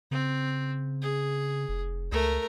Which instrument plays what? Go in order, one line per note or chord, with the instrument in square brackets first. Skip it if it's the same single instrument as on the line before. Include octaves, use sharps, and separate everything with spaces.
[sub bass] C#3 [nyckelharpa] C4
[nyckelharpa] G#4
[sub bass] F1
[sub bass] C#2 [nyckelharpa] A3 A#4